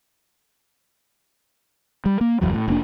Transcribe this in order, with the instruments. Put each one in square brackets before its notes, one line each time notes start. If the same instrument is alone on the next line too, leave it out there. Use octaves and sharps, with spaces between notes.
[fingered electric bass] G3
A#3
F#1 B1 E2 F#3
A2
F1 A#3 D4